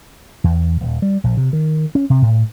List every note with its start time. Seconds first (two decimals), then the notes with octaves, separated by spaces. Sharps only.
0.44 E2
0.81 D#1
1.02 G3
1.24 A#1
1.37 C3
1.53 D#3
1.95 C#4
2.10 C3
2.22 A2